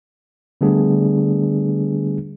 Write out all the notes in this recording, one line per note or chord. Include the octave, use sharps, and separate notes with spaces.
D3 G3 A3 B3 D4 G#4